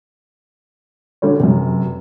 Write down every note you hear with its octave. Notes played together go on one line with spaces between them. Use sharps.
D3 G3 A3 C#4
F1 F#2